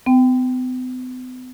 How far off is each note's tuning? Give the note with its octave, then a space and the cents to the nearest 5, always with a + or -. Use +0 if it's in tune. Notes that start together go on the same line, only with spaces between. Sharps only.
B3 +45 G5 -5